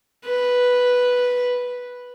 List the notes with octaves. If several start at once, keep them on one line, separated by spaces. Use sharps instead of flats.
B4